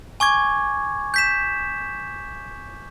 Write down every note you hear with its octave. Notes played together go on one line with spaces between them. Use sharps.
G#5 C#6 D6 G#6
G6 B6 E7